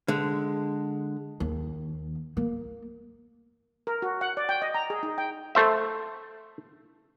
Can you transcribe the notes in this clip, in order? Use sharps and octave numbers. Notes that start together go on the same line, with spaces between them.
D3 G#3
D#2
A#3
A#4
F#4
F#5
D5
G5
D#5
A#5
G#4
D#4
G5
A3 C5 E5